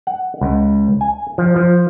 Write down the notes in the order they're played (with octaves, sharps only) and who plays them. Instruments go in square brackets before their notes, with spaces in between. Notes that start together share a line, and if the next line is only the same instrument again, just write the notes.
[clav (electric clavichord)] F#5
C#2
G#5
F3
F3